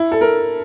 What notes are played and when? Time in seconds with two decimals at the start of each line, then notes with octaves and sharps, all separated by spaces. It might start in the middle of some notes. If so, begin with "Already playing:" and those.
Already playing: E4
0.12 A4
0.21 A#4